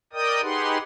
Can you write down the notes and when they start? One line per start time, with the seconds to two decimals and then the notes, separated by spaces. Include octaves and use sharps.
0.13 A#4 D5 D#5 G5 D#6
0.42 D#4 G4 G#4 B4 F#5 C6